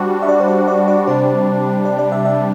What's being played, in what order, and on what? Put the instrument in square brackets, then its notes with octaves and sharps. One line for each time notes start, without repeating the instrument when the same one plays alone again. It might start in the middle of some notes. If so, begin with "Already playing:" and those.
Already playing: [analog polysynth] G3 D4 F#4 [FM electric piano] C5
[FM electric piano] E5
D5
C5
D5
D5
D5
[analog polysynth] C3 G3 D4 [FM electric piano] C5
[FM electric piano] D5
D5
E5
E5